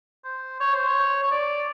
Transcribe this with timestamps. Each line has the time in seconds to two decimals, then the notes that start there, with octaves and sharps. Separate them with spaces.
0.24 C5
0.60 C#5
0.74 C5
0.87 C#5
1.23 C#5
1.31 D5